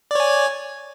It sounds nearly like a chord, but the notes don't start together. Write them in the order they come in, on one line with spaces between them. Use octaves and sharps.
D5 C#5 G#5